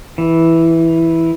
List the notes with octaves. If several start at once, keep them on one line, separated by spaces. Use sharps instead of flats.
E3